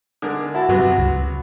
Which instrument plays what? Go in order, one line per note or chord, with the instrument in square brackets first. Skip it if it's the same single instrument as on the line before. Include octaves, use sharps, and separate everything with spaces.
[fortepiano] D3 G#3 A#4
[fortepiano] E4 A5 [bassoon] F#4
[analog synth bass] G2 [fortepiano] C3 F#3 B3
[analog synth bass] C#2